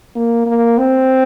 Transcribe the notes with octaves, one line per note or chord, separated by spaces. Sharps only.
A#3
A#3
C4